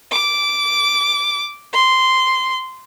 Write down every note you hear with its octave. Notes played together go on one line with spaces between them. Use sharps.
D6
C6